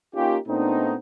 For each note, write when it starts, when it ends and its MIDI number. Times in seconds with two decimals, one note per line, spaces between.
0.14 0.37 58
0.14 0.37 61
0.14 0.37 63
0.14 0.37 65
0.14 0.37 67
0.47 0.94 46
0.47 0.94 57
0.47 0.94 59
0.47 0.94 60
0.47 0.94 62
0.47 0.94 63